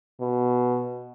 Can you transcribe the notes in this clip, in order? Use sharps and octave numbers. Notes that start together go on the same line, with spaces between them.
B2